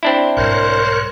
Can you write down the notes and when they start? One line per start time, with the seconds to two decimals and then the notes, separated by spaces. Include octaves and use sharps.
0.03 C4 D4 E4
0.37 B1 G#2 G3 A#4 C5 C#5 F#6